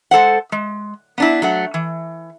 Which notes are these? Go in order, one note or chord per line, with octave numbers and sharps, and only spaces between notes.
G#3 A4 C5 F#5
G#3
B3 D4 E4
F#3 A3 F#5
E3